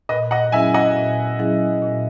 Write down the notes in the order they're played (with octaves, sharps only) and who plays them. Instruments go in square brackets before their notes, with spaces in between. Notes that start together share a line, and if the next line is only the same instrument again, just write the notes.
[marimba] A#2 [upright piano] B4 D#5
[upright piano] D#5 F#5
[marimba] F#3 C#4 E4 G#4 [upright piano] E5 G#5
[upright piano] D#5 F#5
[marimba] A#2
F#3 C#4 E4 G#4
A#2